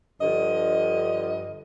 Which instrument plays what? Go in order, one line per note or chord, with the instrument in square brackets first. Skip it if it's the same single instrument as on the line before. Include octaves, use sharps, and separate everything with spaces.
[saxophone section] G2 D3 F3 D#5